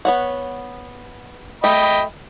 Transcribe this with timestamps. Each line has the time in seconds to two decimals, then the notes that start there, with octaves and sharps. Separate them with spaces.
0.05 B3 C#5 F#5
1.64 A3 D#5 G5 B5